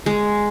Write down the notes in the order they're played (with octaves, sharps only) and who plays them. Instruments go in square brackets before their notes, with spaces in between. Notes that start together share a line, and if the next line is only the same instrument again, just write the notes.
[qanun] G#3